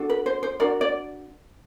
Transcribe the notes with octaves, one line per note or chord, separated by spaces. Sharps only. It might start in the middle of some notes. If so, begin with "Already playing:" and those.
Already playing: D4 F#4 A4
B4
C5
C5
D4 F#4 A#4 D5
D5